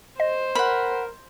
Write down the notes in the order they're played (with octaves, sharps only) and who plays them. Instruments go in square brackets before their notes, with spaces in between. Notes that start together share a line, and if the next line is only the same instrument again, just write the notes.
[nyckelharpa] C5 [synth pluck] D#5
[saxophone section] A#4 [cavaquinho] F#5 B5